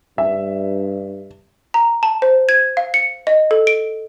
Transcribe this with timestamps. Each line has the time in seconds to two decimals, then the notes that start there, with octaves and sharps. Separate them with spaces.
0.18 G2 E5
1.74 A#5
2.03 A5
2.22 C5
2.49 G#6
2.77 F5
2.94 C#7
3.27 D#5
3.51 A4
3.67 D7